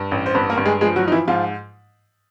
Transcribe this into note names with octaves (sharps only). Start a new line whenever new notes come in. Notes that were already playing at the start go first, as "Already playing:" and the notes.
Already playing: G2
A1
C5
G2 B3 B4
A#3 A#4
G2
G#3 G#4
F3 G#3 G#4
F#3 F#4
F3 D#4
E3 E4
G#2 F3 F4